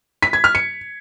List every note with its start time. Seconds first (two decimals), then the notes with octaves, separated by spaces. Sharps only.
0.23 B6
0.33 G#6
0.44 F6
0.55 C#7